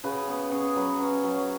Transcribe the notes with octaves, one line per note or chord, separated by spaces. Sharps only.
C#3 F#4 B4
B3
C#3 G#4 C#5
F#3 F#4 B4
C#4
F#3